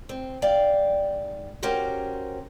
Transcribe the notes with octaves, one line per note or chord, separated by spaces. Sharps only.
C4
G#2 D5 F5 G5
C#4 F#4 G4 A#4 C5